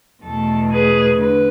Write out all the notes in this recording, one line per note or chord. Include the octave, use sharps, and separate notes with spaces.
E2 B2 A3 A4
G#4 B4
D3 B4